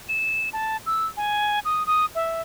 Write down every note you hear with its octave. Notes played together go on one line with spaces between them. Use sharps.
E7
A5
E6
G#5
D#6
D#6
E5